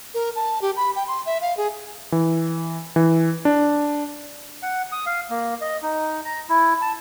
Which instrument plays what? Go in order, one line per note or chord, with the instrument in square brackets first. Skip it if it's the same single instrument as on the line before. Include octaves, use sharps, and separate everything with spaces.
[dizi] A#4
A5
G4
B5
G5
C6
E5
F5
G#4
[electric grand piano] E3
E3
D4
[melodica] F#5
D#6
F5
A#3
D#5
D#4
A#5
E4
A5